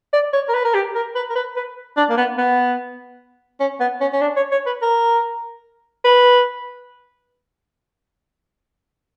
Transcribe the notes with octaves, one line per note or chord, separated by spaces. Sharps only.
D5
C#5
A#4
B4
A#4
G4
A#4
B4
A#4
B4
B4
D4
A#3
B3
B3
C#4
B3
C#4
C#4
D4
C#5
C#5
B4
A#4
B4